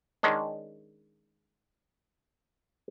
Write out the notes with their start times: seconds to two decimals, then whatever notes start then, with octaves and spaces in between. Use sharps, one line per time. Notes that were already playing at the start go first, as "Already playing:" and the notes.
0.23 D#3 G#3 C#4 D4